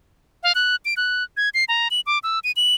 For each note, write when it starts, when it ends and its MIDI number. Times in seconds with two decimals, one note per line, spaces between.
0.43 0.52 77
0.55 0.76 90
0.85 0.94 98
0.97 1.24 90
1.37 1.49 92
1.54 1.64 96
1.68 1.88 82
1.91 2.01 102
2.06 2.19 86
2.23 2.39 88
2.44 2.52 99
2.56 2.75 102